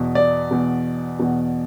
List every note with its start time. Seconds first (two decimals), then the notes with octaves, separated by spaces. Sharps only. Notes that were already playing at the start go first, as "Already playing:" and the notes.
Already playing: E2 B2
0.15 D5
0.51 E2 B2
1.19 E2 B2